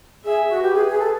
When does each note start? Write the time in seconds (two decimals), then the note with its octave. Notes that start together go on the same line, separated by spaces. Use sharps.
0.24 G#4 E5
0.49 F#4
0.62 G4 B4
0.73 G#4
0.87 G#4
0.99 A4